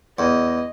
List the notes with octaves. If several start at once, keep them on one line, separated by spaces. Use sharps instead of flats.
E2 D#5